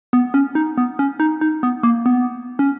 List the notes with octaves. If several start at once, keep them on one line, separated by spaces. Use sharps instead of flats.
B3
C#4
D#4
B3
C#4
D#4
D#4
B3
A#3
B3
C#4